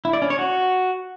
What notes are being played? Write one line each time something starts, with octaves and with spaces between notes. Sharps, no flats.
E4
D5
C#4
C#5
F#4